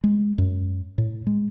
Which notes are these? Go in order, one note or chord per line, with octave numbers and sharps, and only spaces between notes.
G#3
F#2
A2
G#3